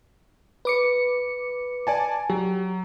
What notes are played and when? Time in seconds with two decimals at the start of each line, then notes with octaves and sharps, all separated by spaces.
0.65 B4 D6 C#7
1.87 D5 G#5 A5
2.30 F#3 G4